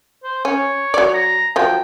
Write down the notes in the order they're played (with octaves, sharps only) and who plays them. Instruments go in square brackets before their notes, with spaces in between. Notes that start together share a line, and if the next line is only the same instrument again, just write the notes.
[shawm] C5
[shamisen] C#4 [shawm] C#5
[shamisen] F#3 D5
[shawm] A#5
[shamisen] F3 F#3 [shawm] G5